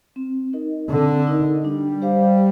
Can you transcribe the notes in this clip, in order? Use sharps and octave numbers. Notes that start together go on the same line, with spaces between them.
C4
D#4 A#4 D#5
D3 C4
D#4 A#4 D#5
G3 D4
G4 C5 F5